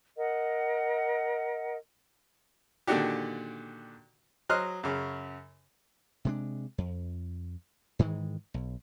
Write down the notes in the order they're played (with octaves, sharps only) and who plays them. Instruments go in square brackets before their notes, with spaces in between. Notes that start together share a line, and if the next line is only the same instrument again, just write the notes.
[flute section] A#4 D#5 F#5
[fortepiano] A#2 D3 D#3 D4 F#4 G4
F#3 C5 D#5 F6 F#6
F#2 C#3
[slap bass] C3 G#3 D4
F2
G#2 D#3 E3 G#3
B1